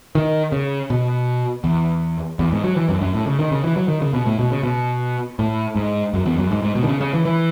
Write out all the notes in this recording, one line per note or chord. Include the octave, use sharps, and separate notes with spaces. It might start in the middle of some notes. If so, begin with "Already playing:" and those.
D#3
C#3
B2
E2
E2
G#2
F#3
E3
F#2
F#2
A2
C#3
D#3
C#3
E3
F#3
D#3
C#3
B2
A2
B2
C#3
B2
A2
G#2
F#2
E2
F#2
G#2
G#2
B2
D#3
C#3
C#3
E3
E3